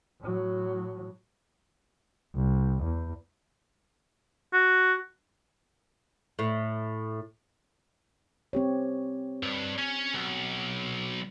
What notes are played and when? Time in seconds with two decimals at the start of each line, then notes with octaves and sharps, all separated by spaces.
0.21 A2 F#3
2.35 C2
2.84 E2
4.54 F#4
6.39 A2
8.53 C4 G4 C#5
9.43 G2
9.78 C#4
10.14 B1